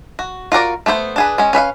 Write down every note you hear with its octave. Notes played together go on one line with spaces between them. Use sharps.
F#4
F4 F#4 A#4 D5
A3 B3 G#4 C5
D4 G#4 B4
G#3 C#4
C#4 B4 E5 F5